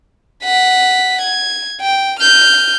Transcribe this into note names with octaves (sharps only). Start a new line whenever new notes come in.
F#5 B6
G#6
G5
F6 G6